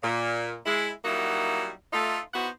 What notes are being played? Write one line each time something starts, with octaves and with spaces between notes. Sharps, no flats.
A#2
G#3 E4
F#3 G3 A#3 D#4 E4 F#4
A3 D#4 F4
B3 D#4 E4 F#4 C5 F#5